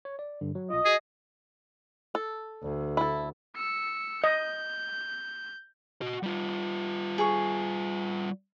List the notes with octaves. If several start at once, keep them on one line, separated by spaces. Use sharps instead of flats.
C#5
D5
G2 D3
F#3
B1 F4 D#5
F#4 G#4 A#6
A4
D2
E4 A4
E6 C#7
D#5 G6
F#4 D#5
G3 F4
G#4 C#6